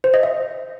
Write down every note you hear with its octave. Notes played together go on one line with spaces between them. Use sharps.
C5
D#5
E5